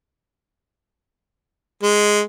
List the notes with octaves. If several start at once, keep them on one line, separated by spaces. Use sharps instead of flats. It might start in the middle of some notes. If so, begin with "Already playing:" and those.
G#3